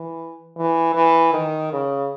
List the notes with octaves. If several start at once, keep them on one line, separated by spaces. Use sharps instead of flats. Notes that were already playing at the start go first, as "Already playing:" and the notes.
Already playing: E3
E3
E3
D#3
C#3